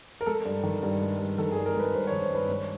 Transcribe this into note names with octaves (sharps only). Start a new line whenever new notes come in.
A#4
G#3 A4
G2
D#3
G2
G#3
G2
D#3 A4
G2 G#4
A#4
G#3 B4
G2 C5
D#3 C#5
C5
G2 B4
G#3 C#5